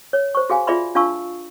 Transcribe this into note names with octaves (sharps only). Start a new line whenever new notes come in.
C#5
C5 C#6
F#4 G#4 F5 G#5
F4 G#4 D5 E5 B5 C6
D4 F4 F5 A5 C#6 E6